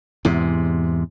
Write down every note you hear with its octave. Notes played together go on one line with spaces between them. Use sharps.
E2 G#2 C3